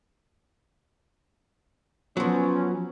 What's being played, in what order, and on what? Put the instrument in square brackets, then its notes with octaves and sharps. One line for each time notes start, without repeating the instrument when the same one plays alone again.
[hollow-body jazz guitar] F3 F#3 [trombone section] B3 C#4